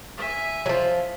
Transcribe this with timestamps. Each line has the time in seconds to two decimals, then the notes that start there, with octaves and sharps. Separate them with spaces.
0.18 E5 G#5
0.66 F3 F#3